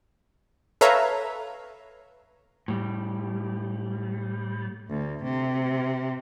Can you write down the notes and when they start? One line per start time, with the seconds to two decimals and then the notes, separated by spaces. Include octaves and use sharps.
0.81 A4 B4 C#5 E5 F5 A#5
2.68 A2 G3
4.90 D2
5.24 C3